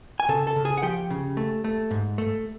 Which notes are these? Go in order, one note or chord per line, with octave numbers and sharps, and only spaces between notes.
G#5
C#3 A4 A5
A4 A5
C#3
G#4 G#5
F#5
F3 G4 G5
C#3
A3
A3
G#2
A3